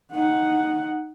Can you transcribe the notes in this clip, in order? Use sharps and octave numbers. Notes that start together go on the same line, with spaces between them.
D#4 F#5